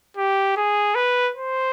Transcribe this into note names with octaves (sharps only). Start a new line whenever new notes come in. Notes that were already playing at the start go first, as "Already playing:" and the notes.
G4
G#4
B4
C5